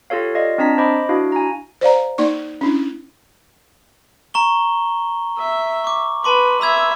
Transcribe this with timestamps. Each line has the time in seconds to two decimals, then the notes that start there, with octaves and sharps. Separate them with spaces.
0.10 F4 G4 A4 C#5 F5
0.34 F4 D5 D#5 F5
0.58 C4 D4 A5 A#5 B6
0.78 C5 D#5 B5 D6
1.09 D4 E4 F#4 F5
1.32 G#5 A#5
1.81 C5 D5 F5 A#5
2.18 A#3 D#4 D5 C#6
2.61 C#4 D4 E4
4.34 A#5 C#6 G7
5.38 E5
5.84 C#6 D6
6.24 B4 A5 C6 D6
6.61 E5 B5 E6 G#6